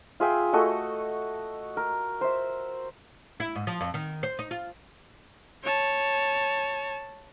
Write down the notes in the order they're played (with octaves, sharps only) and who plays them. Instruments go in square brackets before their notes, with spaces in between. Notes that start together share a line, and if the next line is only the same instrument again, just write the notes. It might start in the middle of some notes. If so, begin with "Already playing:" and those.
[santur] F4 G#4 E5 G5
A3 F#4 A4 D#5
A#4
C5 E5
[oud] E4
G#2
F3
F2
D#3
C5
D#4
F4
[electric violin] C#5 A5